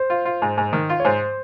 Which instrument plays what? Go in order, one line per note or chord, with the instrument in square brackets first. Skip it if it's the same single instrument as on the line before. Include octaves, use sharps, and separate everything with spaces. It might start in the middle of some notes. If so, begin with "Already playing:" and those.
Already playing: [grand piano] C5
[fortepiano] F4
F4
G#2
G#2
D#3
F4
[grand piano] C#5
[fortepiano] G#2 [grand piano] C5